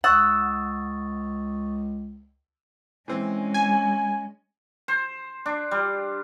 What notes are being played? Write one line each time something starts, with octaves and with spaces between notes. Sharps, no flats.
C#2 F#5 C#6 D#6 E6 A6
E3 G#3 C4 C#4
G#5
C5
D4
G3